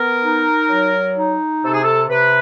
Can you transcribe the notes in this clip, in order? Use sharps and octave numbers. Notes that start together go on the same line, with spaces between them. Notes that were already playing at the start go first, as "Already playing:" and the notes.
Already playing: B3 A#4
D#4
F#3
D#4
C3 A4
G#4
A4
C3 B4